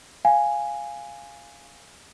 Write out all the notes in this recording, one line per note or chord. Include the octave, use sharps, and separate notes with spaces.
F5 G#5